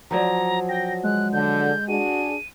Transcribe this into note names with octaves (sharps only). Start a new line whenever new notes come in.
F3 F#3 D5 A#5
G5 A#6
G#3 F#6
D3 G6
D4 F#4 G#4 D#7